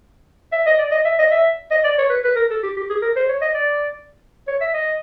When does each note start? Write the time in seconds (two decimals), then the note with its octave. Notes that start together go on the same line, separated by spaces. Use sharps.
0.52 E5
0.66 D#5
0.78 D5
0.91 D#5
1.04 E5
1.19 D#5
1.31 E5
1.71 D#5
1.84 D5
1.98 C#5
2.10 B4
2.24 B4
2.36 A#4
2.50 A4
2.63 G4
2.76 G4
2.90 G#4
3.02 A#4
3.16 C5
3.29 C#5
3.41 D#5
3.54 D5
4.47 C#5
4.61 E5
4.74 D#5